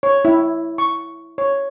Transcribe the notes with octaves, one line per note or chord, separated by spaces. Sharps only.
C#5
E4
C#6
C#5